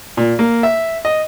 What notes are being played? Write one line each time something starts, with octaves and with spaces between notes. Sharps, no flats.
A#2
A#3
E5
D#5